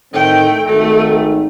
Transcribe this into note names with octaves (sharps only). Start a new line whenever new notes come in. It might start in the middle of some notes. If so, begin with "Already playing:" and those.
A2 D#3 A3 C4 G5
G#1 D#3 A3